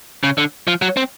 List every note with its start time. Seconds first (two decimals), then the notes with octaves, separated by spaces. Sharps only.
0.24 C#3
0.38 D3
0.67 F3
0.82 F#3
0.97 C4